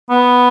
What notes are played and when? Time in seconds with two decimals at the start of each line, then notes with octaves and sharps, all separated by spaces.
0.10 B3